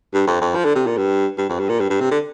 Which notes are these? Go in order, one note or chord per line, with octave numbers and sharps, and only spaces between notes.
G2
F2
F2
F3
D3
C3
A#2
G2
G2
F2
G2
A#2
G2
G2
C3
D3